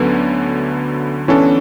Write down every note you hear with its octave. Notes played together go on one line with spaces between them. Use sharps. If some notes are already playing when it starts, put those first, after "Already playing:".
Already playing: D2 D3 F#3 B3 C#4
E3 B3 C#4 D4 A4